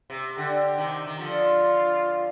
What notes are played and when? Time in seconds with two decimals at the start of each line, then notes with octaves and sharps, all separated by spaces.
0.10 C3
0.37 D3 G4
0.77 C3 D#3
1.07 D#3
1.19 D3 F3 F4